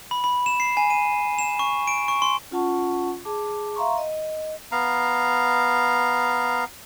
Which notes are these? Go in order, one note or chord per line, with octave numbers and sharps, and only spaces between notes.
B5
B5
E7
C7
G#5
D#7
E7
C#6
D7
C#6
C6
C#4 F4 F#5 A5 C#6
G#4 A5 D6
E5 F5 A#5 C6 C#6
D#5
B3 F5 A#5